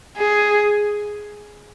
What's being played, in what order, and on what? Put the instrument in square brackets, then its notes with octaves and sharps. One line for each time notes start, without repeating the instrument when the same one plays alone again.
[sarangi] G#4